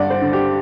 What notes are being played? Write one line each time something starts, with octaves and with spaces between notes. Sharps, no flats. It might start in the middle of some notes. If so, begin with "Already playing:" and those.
Already playing: G2 D3 D5 F#5
C5
D3
G4